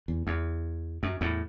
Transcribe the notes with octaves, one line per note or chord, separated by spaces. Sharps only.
E2
E2
F#2
E2 A2